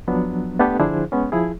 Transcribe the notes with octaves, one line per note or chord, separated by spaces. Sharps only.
F3 F#3 B3 D4
A3 B3 D4 G4 A4 B4
D3 F3 D4 E4 G#4 C5
G#3 B3 C#4
F3 E4 G#4